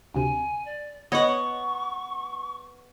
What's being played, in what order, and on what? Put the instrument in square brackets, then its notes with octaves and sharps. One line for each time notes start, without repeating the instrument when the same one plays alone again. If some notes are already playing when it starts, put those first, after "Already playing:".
[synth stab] D2 C3 [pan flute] G#5
[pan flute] D5
[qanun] B3 F#5 [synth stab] C#5 D#5 [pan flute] C#6